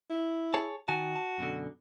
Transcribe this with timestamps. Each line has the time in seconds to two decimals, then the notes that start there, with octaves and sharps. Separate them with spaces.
0.10 E4
0.54 G#4 C#5 A5
0.88 D#3 F#4 G#5 A5
1.16 A5
1.38 F#2 B2 D3